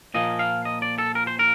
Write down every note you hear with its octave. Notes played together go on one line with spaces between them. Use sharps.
A#2 F3 A#3 D#5
F5
D#5
D5
A4
A#4
C5
A#4